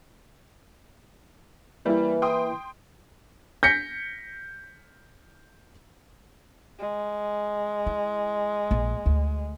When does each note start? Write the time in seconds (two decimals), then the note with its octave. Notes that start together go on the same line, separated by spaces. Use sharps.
1.86 E3 G3 A#3 E4
2.22 G5 C6 D#6
3.63 G6 A#6 B6 C#7
6.79 G#3
7.87 E4
8.71 A#1
9.06 D2